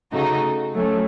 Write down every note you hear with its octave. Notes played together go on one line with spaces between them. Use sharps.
C#3 A3 D#4 F#4
F#3 A3 C#4